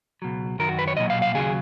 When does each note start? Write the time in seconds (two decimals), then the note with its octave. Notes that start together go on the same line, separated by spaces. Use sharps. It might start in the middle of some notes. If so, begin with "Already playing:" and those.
0.22 C#2 B2 F#3
0.59 F#2 D#3 F#3 A#4
0.69 F#4
0.79 B4
0.87 C#5
0.97 B1 A#2 F#3 D#5
1.10 F5
1.22 F5
1.34 D#2 C#3 F#3 G#4